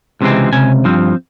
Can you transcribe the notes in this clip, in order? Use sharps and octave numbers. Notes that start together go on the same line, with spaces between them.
C#2 C3 E3 G#3 C4
C#2 C3 G#5
G2 F3 C4